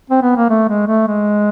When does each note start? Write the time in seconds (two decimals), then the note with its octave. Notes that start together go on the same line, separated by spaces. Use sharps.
0.10 C4
0.22 B3
0.37 A#3
0.50 A3
0.69 G#3
0.87 A3
1.07 G#3